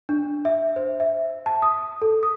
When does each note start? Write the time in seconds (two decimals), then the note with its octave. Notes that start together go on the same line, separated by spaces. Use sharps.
0.09 D4
0.45 E5
0.76 C5
1.00 E5
1.46 A5
1.62 D#6
2.02 A4
2.23 D#6